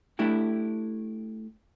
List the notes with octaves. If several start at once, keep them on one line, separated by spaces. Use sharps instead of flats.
A3 D4 E4 G4